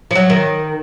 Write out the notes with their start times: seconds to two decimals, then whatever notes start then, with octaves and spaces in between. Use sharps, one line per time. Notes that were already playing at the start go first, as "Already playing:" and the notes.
0.11 F3
0.15 F#3
0.30 D#3